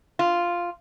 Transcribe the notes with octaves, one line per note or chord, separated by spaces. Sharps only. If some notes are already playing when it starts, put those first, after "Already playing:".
F4